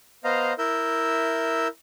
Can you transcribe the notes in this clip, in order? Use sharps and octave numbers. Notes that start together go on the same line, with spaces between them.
B3 C5 D#5 F5 A#5
E4 A#4 E5 E6 G6